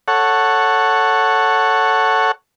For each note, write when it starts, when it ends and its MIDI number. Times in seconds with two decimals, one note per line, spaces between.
0.08 2.32 69
0.08 2.32 73
0.08 2.32 78